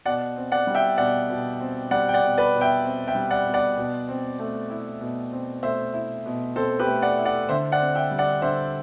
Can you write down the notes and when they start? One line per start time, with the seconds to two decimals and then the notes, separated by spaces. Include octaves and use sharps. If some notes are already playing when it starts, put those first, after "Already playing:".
0.06 B2 D5 F#5
0.36 C4
0.52 D5 F#5
0.67 G3
0.75 E5 G5
0.98 B2 D5 F#5
1.30 B2
1.60 C4
1.91 G3 D5 F#5
2.09 G5
2.14 D5 F#5
2.22 B2
2.38 B4 D5
2.54 B2
2.61 E5 G5
2.84 C4
3.07 E5 G5
3.15 G3
3.30 D5 F#5
3.46 B2
3.54 D5 F#5
3.77 B2
4.08 C4
4.39 A3
4.70 E4
5.01 B2
5.32 C4
5.63 A3 C5 E5
5.94 E4
6.26 B2
6.56 C4 A4 C5
6.79 G4 B4
6.87 A3
7.02 D5 F#5
7.19 E4
7.25 D5 F#5
7.49 D3 C5 E5
7.72 D5 F#5
7.80 C4
7.95 E5 G5
8.11 G3
8.19 D5 F#5
8.42 D3 C5 E5